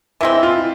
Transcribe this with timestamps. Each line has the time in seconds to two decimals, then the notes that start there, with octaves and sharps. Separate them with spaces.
0.21 E3 G#3 C4 E4
0.43 F4